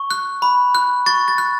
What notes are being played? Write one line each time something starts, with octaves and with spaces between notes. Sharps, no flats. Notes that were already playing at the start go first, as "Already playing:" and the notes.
Already playing: C#6
F#6
B5
F#6
C#6 A6
A6
F#6